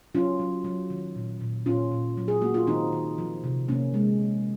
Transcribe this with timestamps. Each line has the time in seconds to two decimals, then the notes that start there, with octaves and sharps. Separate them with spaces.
0.15 F#3 C#4 F4
0.40 F#3
0.65 F#3
0.90 D#3
1.16 A#2
1.41 A#2
1.66 A#2 C#4 F4
1.91 A#2
2.17 F#3
2.28 G#4
2.42 A#3 F#4
2.54 F4
2.67 D#3 C4 D#4
2.93 D#3
3.18 F3
3.43 C3
3.68 C3 A#3 C#4
3.94 G#3